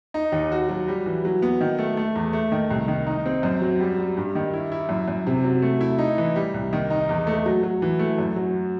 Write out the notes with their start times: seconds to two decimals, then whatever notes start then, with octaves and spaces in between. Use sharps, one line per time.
0.14 D#4
0.32 D#2
0.52 F#4
0.69 F#3
0.88 G3
1.06 E3
1.25 F#3
1.42 B3
1.61 D#3
1.78 A3
1.97 A3
2.16 E2
2.33 A3
2.52 D#3
2.70 C2
2.88 D#3
3.07 D#4
3.26 C4
3.43 F#2
3.62 F#3
3.80 G3
3.98 G3
4.17 G2
4.35 D#3
4.54 E4
4.72 E4
4.89 F#2
5.08 F#2
5.27 C3
5.44 F#3
5.62 A3
5.81 E4
5.98 D#4
6.18 E3
6.36 G3
6.54 C2
6.73 D#3
6.90 D#4
7.09 E2
7.27 A3
7.46 F#3
7.63 F#3
7.82 E3
7.99 A3
8.18 F#2
8.36 F#3